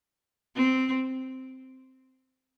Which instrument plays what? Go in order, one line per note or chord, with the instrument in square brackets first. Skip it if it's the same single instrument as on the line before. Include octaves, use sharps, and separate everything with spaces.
[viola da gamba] C4